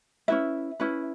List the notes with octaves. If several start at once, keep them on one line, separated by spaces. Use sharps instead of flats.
C#4 E4 B4 E5
C#4 E4 B4